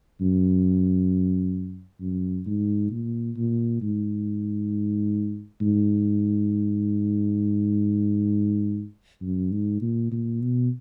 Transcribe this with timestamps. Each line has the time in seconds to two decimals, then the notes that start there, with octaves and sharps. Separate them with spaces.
0.21 F#2
2.01 F#2
2.46 G#2
2.91 A#2
3.37 A#2
3.82 G#2
5.61 G#2
9.22 F#2
9.52 G#2
9.82 A#2
10.12 A#2
10.42 B2